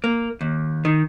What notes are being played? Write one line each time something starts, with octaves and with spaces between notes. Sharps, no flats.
A#3
D#2
D#3